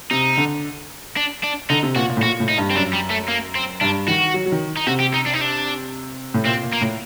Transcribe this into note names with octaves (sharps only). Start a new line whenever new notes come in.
C3 D#4
D3
D4
D4
D3 D#4
C3
A#2 F#4
A#2
A2
A#2 F#4
A2
D#4
G2
C4
F#2 D4
G3
A3
A#3
C4
G2 D4
D#3 F#4
F#3
F#3
D#3
D#4
C3 F#4
G4
D#4
D4
D#4
D4
A2
A#2 C4
A#2
A#3
A2